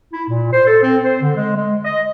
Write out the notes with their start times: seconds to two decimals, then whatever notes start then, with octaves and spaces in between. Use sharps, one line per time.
0.14 E4
0.29 A#2
0.53 C5
0.67 A4
0.84 C4
1.04 C5
1.21 D3
1.36 G#3
1.56 G#3
1.83 D#5